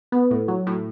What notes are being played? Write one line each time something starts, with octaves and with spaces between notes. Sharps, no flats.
B3
A2
F#3
A2